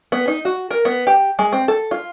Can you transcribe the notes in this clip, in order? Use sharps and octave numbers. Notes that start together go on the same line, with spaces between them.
B3
D#4
F#4
A#4
B3
G4
G#3
C4
A4
F4